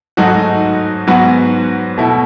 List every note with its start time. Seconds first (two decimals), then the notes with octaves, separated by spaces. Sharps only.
0.17 G#2 F#3 A3 D#4 F#4
1.07 G#2 F#3 B3 F#4
1.98 B2 A3 E4